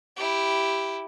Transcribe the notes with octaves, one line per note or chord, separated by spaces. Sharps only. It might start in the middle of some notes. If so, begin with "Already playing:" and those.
E4 G4